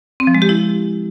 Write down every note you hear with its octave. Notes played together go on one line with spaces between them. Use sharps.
C4
F3
G#3
G4
E4